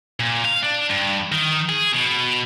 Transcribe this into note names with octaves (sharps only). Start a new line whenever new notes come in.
A#2
F5
D4
G2
D#3
G#4
B2